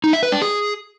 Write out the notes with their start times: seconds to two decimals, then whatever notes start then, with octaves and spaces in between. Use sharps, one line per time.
0.04 D#4
0.13 E5
0.23 B4
0.32 D4
0.42 G#4